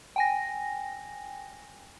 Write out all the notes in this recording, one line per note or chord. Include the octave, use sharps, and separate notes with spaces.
G5 G#5 A#6